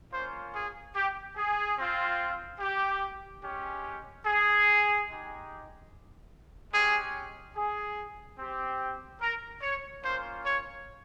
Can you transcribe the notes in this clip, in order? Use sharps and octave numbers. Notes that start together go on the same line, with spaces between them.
A#3 C#4 F4 C5
G#4
G4
G#4
C4 F4
G4
G#3 C#4 G4
G#4
G#3 D#4 G4
G#3 C#4 G4 G#4
G#4
C4 G4
A#4
C#5
A#3 C#4 F4 C5
C#5